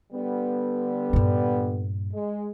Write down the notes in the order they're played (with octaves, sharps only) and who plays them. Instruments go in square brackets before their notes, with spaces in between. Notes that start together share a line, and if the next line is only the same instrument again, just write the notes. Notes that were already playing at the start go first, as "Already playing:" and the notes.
[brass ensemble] D3 G3 B3
[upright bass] G2 A#2
[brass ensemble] G#3